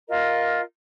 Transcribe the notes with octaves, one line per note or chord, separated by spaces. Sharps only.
F4 A#4 D#5